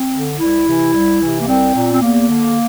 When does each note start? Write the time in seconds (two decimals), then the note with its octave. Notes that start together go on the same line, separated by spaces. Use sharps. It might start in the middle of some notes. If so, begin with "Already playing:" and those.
Already playing: C4
0.13 D3
0.39 C2 E4
0.66 C3 E3
0.93 C2
1.20 C3 E3
1.41 A#3
1.47 C2 C4
1.75 A#2
1.92 C4
2.01 E2 A#3
2.28 D3